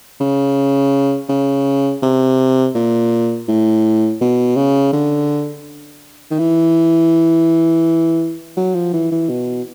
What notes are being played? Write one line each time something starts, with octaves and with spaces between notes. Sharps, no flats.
C#3
C#3
C3
A#2
A2
B2
C#3
D3
D#3
E3
F#3
F3
E3
E3
B2